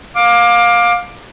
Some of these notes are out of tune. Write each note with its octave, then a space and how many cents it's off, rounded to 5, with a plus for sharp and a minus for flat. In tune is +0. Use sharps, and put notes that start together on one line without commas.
F5 +20 D6 +10